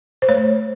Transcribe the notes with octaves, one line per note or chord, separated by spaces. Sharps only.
C5
A3 C#5